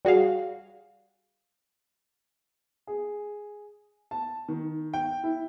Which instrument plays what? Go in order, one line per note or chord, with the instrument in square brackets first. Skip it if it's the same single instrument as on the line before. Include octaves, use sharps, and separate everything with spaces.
[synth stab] G3 F#4 G#4 F5
[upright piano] G#4
A5
D#3
G5
E4